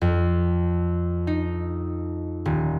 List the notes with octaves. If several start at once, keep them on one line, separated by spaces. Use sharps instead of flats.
F2
D#4
D#1